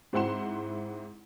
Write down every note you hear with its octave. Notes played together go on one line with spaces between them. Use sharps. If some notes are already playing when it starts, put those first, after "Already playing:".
G#2 C4 E4 F#5 C6 E7